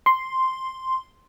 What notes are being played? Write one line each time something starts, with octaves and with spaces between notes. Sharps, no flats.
C6